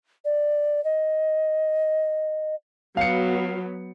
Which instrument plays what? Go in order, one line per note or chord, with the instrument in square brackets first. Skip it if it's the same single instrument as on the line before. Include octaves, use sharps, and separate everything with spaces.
[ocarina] D5
D#5
[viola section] F#3 B3 [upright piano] F5 C#7